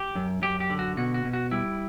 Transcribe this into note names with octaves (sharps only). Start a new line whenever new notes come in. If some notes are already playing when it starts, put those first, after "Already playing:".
Already playing: G4
F#2
F#2 G4
G4
D3
F#4
B2 F#4
F#4
B2
F#4
G3 E4